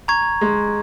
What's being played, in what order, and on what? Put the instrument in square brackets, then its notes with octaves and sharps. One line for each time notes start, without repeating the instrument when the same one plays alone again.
[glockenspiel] A#5 C#6 G#6
[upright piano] G#3